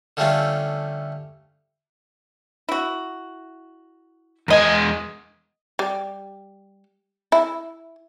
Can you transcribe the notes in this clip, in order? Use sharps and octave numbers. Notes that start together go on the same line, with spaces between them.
D3 F3 G3 A3 C#4 F4
E4 F#4
E2 G#3 A#4 D#5 G#5
G3
E4